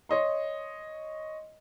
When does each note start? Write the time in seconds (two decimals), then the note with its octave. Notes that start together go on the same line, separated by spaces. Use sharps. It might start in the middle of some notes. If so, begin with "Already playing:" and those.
0.09 C#5 D#5 C6